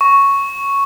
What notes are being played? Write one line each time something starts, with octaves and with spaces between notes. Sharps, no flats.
C#6